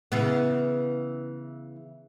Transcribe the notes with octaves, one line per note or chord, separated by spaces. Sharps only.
C#3 E3 B3